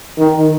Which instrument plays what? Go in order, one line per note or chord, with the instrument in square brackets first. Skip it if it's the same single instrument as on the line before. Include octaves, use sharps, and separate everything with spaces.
[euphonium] D#3